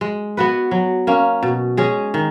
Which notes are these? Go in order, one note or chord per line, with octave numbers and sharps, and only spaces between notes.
G#3
B3 F#4 B4
F#3
A#3 C#4
B2
G#3 C#4 G#4
D#3